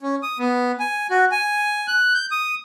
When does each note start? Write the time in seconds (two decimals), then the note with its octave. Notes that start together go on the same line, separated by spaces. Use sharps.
0.01 C#4
0.23 D#6
0.39 B3
0.80 G#5
1.10 F#4
1.31 G#5
1.88 F#6
2.14 G6
2.31 D#6